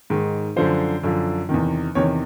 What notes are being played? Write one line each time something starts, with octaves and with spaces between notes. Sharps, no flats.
G#2 D#3
F#2 D3 F3 C5
F#2 D3 F3
E2 C3 D#3
E2 C3 D#3 C#5